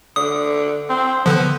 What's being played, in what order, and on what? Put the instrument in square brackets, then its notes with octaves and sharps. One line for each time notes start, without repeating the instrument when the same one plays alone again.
[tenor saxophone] D3 [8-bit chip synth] D#6
[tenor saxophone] C4
[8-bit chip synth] D3 F3 [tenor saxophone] B3